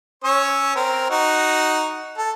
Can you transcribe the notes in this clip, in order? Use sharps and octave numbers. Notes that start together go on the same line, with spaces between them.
C#4 C#5 E6
C4 A#4
D#4 F#4
A4